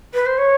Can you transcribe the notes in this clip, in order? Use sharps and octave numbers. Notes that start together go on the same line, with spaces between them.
B4
C5
C#5